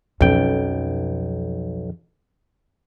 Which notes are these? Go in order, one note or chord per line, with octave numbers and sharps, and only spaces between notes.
B1 F2 C#4 G5